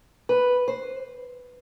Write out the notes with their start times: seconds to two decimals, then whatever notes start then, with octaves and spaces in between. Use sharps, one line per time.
0.29 B4
0.68 C5